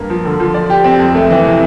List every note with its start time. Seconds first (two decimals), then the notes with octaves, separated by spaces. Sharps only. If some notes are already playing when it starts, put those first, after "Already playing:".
Already playing: G2 A#3
0.10 F3
0.25 D3
0.40 F3
0.54 D5
0.70 G4
0.84 C4
0.99 F2
1.15 A3
1.30 E3
1.45 C3